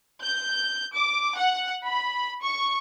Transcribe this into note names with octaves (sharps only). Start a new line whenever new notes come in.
G6
D6
F#5
B5
C#6